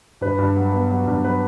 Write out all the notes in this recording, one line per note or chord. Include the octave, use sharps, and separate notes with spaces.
G2 B4
G2
F#3
B3
F#3
G2
F#3 B4